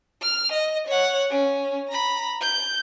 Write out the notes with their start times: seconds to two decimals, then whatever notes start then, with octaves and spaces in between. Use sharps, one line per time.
0.22 F6
0.52 D#5
0.87 C#5 F#5
1.31 C#4
1.89 A#5 B5
2.41 G6